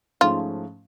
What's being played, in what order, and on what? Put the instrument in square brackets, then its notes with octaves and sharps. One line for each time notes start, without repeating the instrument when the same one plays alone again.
[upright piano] G#2 F3 A3 C#4 G#4 [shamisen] F4